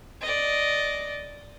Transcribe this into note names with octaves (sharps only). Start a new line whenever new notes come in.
D5 D#5